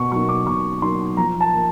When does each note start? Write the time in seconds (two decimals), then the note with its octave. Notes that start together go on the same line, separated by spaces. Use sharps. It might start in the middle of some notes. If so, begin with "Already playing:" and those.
Already playing: B2 C#6
0.12 F#3 A#3 D#4 C#6
0.29 D6
0.47 B2 C#6
0.82 F#3 A#3 D#4 C6
1.17 F3 A#5
1.41 A5
1.53 A#3